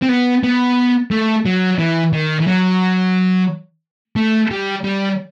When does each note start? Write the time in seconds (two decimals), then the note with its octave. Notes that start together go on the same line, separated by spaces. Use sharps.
0.02 C4
0.09 B3
0.44 B3
1.11 A3
1.45 F#3
1.79 E3
2.13 D#3
2.41 E3
2.47 F#3
4.16 A3
4.51 G3
4.84 G3